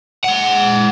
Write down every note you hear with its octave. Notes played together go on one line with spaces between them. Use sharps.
G#3 F#5